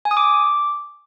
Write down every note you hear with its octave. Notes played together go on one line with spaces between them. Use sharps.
G#5
D#6
D6